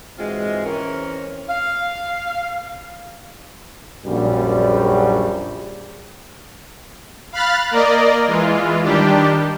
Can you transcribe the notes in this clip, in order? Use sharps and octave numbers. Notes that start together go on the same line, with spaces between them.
G#2 E3 G#3 C4 F4 F#4
E3 C4 C#4 A#4
F5
A#1 F#2 G3
F5 B5 F6 F#6 A6
A#3 A#4 D5 D#5
E3 G#3 F4
D#3 G3 D4 G4